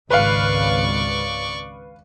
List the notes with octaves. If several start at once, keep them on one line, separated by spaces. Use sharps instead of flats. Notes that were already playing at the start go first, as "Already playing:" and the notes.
G#1 C#2 C#3 B4 D5 F5 C#6